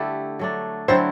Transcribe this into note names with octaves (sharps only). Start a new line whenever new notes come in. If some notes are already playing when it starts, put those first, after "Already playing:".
Already playing: D3 A3 E4 G4
F#3 A3 D4
D3 F#3 C4 E4 C5